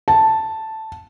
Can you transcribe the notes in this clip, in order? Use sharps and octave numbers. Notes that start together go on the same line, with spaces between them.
A5